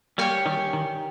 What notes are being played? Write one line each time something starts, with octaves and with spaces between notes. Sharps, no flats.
G3 A#3 G4 C#5 G#5
D#3 G3
D#3